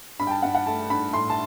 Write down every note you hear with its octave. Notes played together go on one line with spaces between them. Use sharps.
G2 B5
G5
A5
G2 F#5
F#5
A3 A5
G2 B5
A2 C6
A5